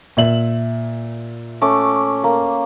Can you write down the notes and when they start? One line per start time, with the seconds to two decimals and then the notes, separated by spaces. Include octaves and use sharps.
0.17 A#2 E5 F#7
1.61 A3 C#4 D6
2.24 A#3